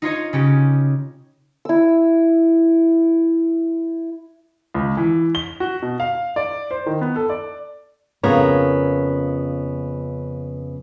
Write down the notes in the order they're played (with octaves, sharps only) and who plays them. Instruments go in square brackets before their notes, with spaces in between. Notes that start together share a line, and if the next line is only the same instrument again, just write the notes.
[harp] D#4 F4 C#5 D#5
C#3 C#4 G4
[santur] E4 E6
[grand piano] C#2
E3
G7
F#4
B2
F5
D5
C5
D#3
B3
A4
D5
[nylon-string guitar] F2 C#3 B3 A#4 C#5